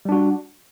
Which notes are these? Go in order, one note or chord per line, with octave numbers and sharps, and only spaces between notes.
G3 D4 F#4